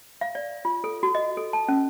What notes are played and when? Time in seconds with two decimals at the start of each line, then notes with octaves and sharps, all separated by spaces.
0.21 F5
0.35 D5
0.65 F4
0.84 A4
1.03 F#4
1.15 D#5
1.37 A4
1.53 A5
1.68 C#4